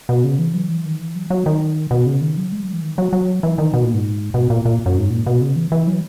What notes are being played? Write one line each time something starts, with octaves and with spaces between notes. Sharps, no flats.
B2
C#3
E3
F#3
E3
D#3
E3
F#3
F#3
D#3
B2
C#3
D#3
F#3
G#3
F#3
E3
D#3
F#3
F#3
E3
D#3
B2
A#2
G#2
B2
A#2
A#2
F#2
G#2
A#2
B2
C#3
E3
E3
F#3